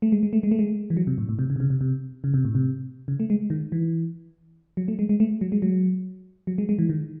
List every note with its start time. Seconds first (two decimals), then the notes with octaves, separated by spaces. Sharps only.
0.02 A3
0.12 G#3
0.23 G#3
0.33 A3
0.43 G#3
0.51 A3
0.59 G#3
0.90 E3
0.97 F#3
1.07 C3
1.18 A2
1.29 A2
1.39 C3
1.50 C#3
1.56 C3
1.60 C#3
1.70 C3
1.81 C3
2.24 C#3
2.34 C3
2.45 A2
2.55 C3
3.08 C#3
3.20 A3
3.30 G#3
3.50 D#3
3.72 E3
4.77 F#3
4.88 A3
4.99 G#3
5.09 G#3
5.20 A3
5.41 F#3
5.52 G#3
5.62 F#3
6.47 F#3
6.58 G#3
6.69 G#3
6.79 E3
6.89 D#3